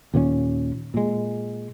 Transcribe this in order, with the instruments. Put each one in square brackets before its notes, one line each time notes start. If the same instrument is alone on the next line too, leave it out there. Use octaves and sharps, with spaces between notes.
[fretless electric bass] D#2 A#2 A#3 C#4
A#2 G#3